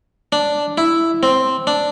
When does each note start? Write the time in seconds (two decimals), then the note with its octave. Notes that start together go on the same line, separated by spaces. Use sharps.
0.32 D4
0.78 E4
1.23 C4
1.67 D4